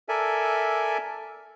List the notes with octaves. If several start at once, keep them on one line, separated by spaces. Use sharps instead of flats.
A4 A#4 D5 E5 G#5